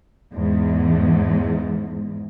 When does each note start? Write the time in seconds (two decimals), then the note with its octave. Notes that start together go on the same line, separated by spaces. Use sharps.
0.33 E2 G#2